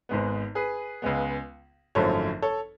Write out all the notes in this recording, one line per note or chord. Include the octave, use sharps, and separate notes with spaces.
G#1 G#2 G#3 B3
G#4 B4
C#2 C#3 G#3 B3
G#1 F#2 D3 F3 A3 A4 C#5
A4 C#5